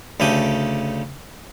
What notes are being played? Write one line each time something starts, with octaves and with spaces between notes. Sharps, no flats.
D2 C#3 A3 G4 G#5